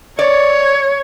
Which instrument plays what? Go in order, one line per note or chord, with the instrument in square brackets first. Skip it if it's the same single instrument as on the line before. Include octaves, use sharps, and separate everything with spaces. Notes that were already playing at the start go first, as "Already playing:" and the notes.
[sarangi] C#5 [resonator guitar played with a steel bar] D5